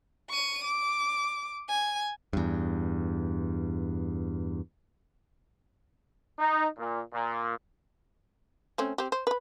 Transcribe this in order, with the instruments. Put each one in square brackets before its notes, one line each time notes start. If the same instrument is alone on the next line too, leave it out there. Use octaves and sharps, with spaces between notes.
[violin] C#6 D#7
D6
G#5
[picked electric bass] E2 G2
[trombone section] D#4
A#2
A#2
[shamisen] A3 C4 C#4
C4 G4
C5
B4 B5